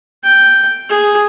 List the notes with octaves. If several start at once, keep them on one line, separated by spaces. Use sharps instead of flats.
G5
G#4